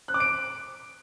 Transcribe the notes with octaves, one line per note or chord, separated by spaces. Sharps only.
F#6
D6
D7